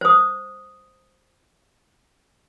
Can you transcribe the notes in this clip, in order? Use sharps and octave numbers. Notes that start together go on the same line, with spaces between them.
C5 D#6